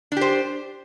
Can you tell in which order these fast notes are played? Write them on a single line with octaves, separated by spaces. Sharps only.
D4 G4 C5